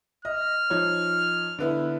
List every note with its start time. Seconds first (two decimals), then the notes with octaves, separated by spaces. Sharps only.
0.25 D#5 F6
0.70 F3 D#4 C#5
1.59 D3 B3 E4